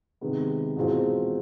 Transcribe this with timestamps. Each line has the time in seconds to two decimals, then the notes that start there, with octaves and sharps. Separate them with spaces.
0.21 C3 D#3 G#3 B3
0.76 E2 B2 G#3 C4 F4